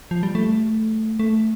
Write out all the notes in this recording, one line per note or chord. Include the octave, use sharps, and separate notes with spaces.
F3
G3
A3
A3